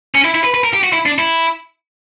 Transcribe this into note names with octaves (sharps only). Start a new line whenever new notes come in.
C#4
E4
E4
B4
B4
A#4
G4
F#4
E4
D4
E4